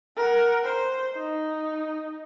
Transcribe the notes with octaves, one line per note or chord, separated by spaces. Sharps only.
A#4 F#5
C5
D#4